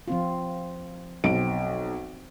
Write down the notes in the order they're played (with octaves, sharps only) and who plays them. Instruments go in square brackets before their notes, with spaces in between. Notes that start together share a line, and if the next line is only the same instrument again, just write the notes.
[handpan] F3 C4 F4
[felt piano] B1 D7 [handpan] C4